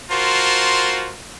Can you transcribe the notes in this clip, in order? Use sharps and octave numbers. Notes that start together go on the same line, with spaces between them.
F4 F#4 A#4 C5 A5 C6